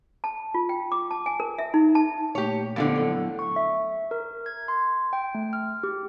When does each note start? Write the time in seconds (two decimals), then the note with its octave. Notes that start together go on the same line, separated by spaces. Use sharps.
0.24 A5
0.54 F4
0.69 G5
0.92 D6
1.11 A5
1.26 G#5
1.40 A#4
1.58 E5
1.74 D#4
1.95 A5
2.35 A#2 A3 A#3 G4 C#5
2.76 F2 A2 D3 B3
2.96 F#3 E4 A4
3.39 C#6
3.56 E5
4.11 A#4
4.46 G#6
4.68 C6
5.13 G5
5.35 A3
5.53 F6
5.83 G4